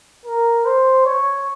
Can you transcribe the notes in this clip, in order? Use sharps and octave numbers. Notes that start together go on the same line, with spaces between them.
A#4
C5
C#5